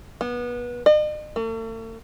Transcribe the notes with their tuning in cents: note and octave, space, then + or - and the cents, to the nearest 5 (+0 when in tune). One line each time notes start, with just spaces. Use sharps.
B3 -25
D#5 -45
A3 +45